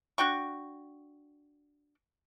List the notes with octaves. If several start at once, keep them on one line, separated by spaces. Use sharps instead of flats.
D4 F#4 G5 C#6